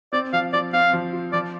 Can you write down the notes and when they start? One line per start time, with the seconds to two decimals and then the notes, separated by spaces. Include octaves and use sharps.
0.13 C4 D5
0.33 F3 F5
0.53 F3 D5
0.73 C4 F5
0.93 F3
1.13 F4
1.33 F3 D5